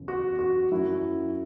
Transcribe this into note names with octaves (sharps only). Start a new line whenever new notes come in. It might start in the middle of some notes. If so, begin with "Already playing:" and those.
Already playing: F#1 E2 E3 C#4
F#4
F#4
F#2 F#3 C#4 E4 F#4